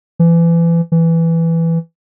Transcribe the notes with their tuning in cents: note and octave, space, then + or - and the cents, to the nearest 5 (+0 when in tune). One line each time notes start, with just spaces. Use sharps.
E3 +30
E3 +5